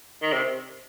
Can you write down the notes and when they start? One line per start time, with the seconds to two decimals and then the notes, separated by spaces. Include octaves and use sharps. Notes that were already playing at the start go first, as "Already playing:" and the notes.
0.22 D#3
0.32 C3